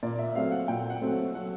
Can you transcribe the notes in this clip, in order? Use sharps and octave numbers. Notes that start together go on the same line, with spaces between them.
A#2 D5
E5
F#3 A3 C4 F5
F#5
A#2 G5
F#5
F#3 A3 C4
F#3 F#5